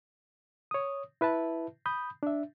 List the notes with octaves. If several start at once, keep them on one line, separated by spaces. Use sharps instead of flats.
C#5 D#6
E4 B4 E5 A5
B5 D#6 G6
D4 E5